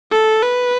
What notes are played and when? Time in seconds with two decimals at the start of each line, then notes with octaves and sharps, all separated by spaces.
0.12 A4
0.42 B4